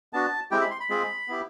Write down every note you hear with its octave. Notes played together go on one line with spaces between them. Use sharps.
B3 D4 F#4 A5
G#3 C4 E4 G4 G5
B5
C6
B5
G#3 C4 F4 G#4
B3 E4 G4